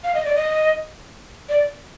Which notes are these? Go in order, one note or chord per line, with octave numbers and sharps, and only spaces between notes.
F5
D#5
D5
D#5
D5